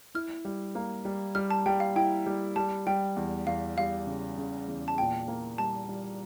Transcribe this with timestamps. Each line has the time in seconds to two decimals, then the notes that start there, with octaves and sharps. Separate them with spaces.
0.15 E4 F6
0.45 G3
0.75 A#3
1.05 G3
1.35 G3 F6
1.50 A5
1.66 G3 G5
1.80 F5
1.96 E4 G5
2.26 G3
2.56 G3 A5
2.87 G3 G5
3.16 E2
3.47 E2 F5
3.77 G3 F5
4.07 C#3
4.38 C#3
4.68 E2
4.88 A5
4.98 A#2 G5
5.28 A#3
5.58 G3 A5
5.89 G3